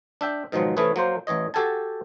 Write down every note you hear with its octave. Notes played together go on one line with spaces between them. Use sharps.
D4 E5 G5
G#2 B2 D#3 F3 F#3 G#3
C3 E3 A3 C#4 G#4 B4
F#3 A#3 C5
A1 E3 C#5 D#5
F#4 G4 A4 F#5 G#5 A5